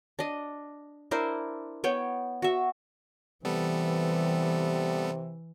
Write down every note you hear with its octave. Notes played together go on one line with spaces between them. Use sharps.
D4 D#5
D4 E4 A#4 C5
B3 C#5 G5
F#4 E5
C3 E3 G3 B3 A4